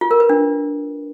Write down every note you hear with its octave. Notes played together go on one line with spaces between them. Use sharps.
F4
A#4
B4
D4